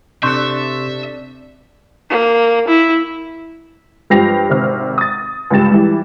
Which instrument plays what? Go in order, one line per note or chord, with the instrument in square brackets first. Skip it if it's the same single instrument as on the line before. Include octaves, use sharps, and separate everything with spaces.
[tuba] C3 [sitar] D4 A4 [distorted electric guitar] E5 [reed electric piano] C6 C#6 G6
[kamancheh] A#3
E4
[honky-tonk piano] G2 F3 G4 A#6 C7 F7
G#1 C3 F6
D#6 A6
C#2 G2 G4 A6 E7
E3 G3